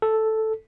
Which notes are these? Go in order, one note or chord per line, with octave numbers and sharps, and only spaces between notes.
A4